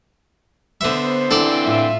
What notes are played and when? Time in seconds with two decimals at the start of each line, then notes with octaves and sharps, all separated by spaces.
0.81 D3 B3 C5 E5
1.31 D3 E3 C4 A4 D5
1.64 A2 F4 E5